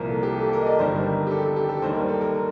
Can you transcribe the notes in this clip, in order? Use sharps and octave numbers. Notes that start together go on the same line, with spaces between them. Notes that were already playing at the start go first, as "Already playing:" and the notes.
Already playing: C2 A#2 F3 A#4
A4
G4
A4
A4
A#4
D#5
D5
G1 G2 D#3 G3 C5
A#4
A#4
G4
A4
A4
G4
A4
D#2 D#3 G3 C5
A#4
A4
A#4
A#4